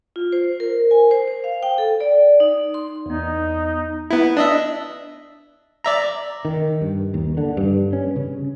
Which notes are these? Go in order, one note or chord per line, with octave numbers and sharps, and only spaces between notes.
F4
C5
A#4
G#5
C5
C5
F5
G5
A4
D5
D#4
C6
E2 B3 D#4
B3 E4
D4 D#5 E5
D5 E5 A#5
D#3
G2
D#2
D3
G2
C#4
C#3